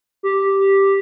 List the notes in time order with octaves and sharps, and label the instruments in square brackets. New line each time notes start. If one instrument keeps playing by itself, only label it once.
[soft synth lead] G4